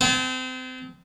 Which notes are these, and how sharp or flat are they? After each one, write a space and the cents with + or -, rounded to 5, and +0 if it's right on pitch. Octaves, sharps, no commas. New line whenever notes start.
C4 -30 A5 -40